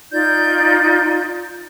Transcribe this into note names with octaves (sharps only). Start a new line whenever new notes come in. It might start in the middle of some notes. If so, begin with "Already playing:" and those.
D#4 F4 D5 G6